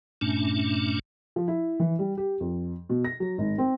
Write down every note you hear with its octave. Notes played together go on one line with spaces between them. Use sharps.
G2 A#2 A3 C#4 D4
F3
E4
E3
G3
G4
F2
B2
A#6
F#3
G#1
C4